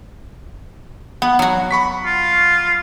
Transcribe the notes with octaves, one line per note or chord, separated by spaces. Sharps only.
B3 F#5
F#3 F#4
B5 C#6 B6
F4